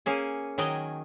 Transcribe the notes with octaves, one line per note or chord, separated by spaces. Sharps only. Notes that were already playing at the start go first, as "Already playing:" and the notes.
A#3 C#4 G#4
D#3 F#3 G#4 D#5 G5